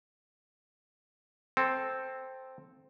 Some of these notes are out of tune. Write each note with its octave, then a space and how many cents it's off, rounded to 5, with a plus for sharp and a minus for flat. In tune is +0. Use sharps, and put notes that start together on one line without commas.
C4 +0 A4 -5